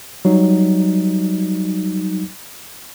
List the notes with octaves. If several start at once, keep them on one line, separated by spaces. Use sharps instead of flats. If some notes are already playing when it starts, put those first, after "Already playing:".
F#3 G3 D#4